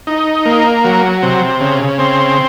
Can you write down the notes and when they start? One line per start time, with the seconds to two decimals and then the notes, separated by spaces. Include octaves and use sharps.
0.07 D#4
0.45 A#3
0.84 F#3
1.23 C3
1.60 C#3
1.98 C4